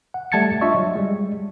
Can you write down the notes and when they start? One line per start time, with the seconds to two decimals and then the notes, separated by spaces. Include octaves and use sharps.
0.14 F#5
0.32 G3 A3 A5 G#6 A6 C#7
0.61 D4 F4 D#5 E5 C#6
0.74 F#3
0.95 G3 G#3